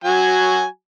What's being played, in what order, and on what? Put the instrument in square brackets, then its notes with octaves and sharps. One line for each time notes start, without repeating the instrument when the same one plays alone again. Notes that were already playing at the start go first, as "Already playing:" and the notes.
[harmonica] F#3 F#4 G#5